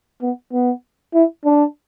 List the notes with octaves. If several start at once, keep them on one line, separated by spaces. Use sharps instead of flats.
B3
B3
E4
D4